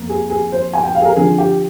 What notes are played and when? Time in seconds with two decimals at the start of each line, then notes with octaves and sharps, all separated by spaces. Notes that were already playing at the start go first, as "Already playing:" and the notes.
Already playing: F2 A#3
0.09 G#4
0.30 G#4
0.52 C5
0.73 G#5
0.83 G5
0.95 F5
1.01 G#4
1.05 A#4
1.16 D3 F3 C4 G#4
1.38 G4